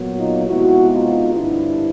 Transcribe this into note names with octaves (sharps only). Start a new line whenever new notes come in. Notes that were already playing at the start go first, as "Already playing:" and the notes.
Already playing: A#2 F#3 B3
D#4 F4
C3 F3 G#3 B3 E4 F#4
D#4 F4
G2 D3 F3 D4 E4